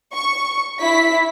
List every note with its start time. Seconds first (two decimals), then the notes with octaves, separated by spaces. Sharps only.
0.13 C#6
0.81 E4 B6